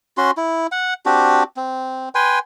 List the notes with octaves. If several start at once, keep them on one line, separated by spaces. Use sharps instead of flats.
C#4 F#4 C6
E4
F#5
C4 D4 F#4 G4
C4
B4 G5 G#5 C6